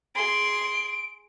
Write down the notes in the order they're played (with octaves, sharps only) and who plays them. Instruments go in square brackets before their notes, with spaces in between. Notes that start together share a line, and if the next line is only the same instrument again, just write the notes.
[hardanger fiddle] G#4 C6 [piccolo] D7